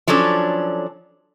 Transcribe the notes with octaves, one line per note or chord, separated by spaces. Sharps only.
F3 F#3 C#4 D4 A4